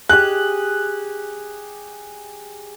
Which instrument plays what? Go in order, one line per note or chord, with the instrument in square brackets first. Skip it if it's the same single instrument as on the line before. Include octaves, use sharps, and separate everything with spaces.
[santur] G4 G#4 [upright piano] F#6